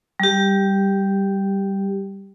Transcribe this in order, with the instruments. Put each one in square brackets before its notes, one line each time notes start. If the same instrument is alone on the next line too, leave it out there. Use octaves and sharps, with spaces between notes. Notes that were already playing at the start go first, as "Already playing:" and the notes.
[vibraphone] G3 G4